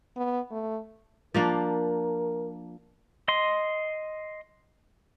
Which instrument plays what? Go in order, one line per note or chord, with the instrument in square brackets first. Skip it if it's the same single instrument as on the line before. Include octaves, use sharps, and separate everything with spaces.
[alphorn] B3
A3
[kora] F3 A#3 D4 [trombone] A#4
[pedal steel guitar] D#5 C6